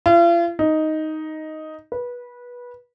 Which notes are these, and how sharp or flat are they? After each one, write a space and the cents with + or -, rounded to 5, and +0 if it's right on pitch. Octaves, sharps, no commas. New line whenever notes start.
F4 -40
D#4 +5
B4 -20